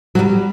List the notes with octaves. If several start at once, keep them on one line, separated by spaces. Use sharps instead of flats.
F#3
G3